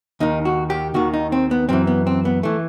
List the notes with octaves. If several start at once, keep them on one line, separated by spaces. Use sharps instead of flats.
D#2 D#3 D#4
F#4
G4
D#2 D#3 F#4
D#4
C4
B3
F#2 E3 C4
B3
C4
B3
E3 A3